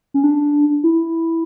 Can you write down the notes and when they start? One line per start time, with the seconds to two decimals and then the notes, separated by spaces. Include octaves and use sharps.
0.14 C#4
0.24 D4
0.84 E4